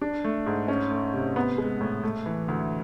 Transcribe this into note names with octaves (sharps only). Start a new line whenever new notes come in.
D4
A3
G#2
C#4
A3
C3
B3
G#3
A2
A3
E3
D2